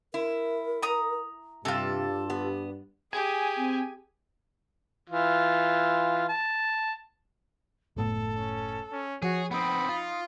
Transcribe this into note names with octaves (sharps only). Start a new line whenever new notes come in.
E4 A#4
A#5 D#6
G2 C3 F4 G4 A4
B3
G4 G#4 G#5
C4
E3 F4
A5
F#1 A2 B3 A4
C#4
C#4
F3 F#4 G#4 C#5
B3 C4 D#4 B5
F4